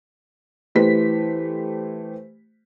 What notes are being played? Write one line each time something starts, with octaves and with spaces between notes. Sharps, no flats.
E3 A3 G4 C5 B6